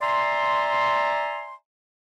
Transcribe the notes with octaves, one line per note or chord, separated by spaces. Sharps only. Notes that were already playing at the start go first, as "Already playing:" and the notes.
D5 E5 G#5 A#5 C6